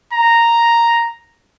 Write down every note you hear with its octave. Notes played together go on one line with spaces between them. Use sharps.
A#5